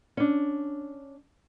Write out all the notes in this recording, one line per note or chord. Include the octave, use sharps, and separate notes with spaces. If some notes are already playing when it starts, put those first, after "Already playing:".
C#4 D4